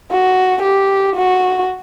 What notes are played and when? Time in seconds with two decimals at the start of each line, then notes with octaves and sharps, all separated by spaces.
0.11 F#4
0.63 G4
1.16 F#4